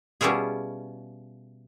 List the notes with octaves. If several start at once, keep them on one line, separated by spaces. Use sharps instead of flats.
B2 G3 C#4 E4 F4 G#4